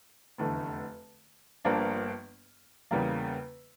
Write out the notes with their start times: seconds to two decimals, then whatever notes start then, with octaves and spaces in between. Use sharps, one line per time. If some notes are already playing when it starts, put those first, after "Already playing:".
0.38 F1 E2 D3 A3
1.65 G1 G2 F3 A#3 D4
2.91 E2 C#3 G3 A#3